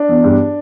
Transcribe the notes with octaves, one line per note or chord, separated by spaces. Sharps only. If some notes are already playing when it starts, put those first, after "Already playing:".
Already playing: D4
E2
G2